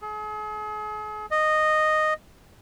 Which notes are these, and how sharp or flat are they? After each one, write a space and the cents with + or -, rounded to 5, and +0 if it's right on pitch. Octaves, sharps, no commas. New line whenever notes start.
G#4 +40
D#5 -10